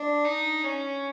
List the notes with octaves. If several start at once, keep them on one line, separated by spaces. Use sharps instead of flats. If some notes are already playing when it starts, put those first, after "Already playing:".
Already playing: D4
D#4
C#4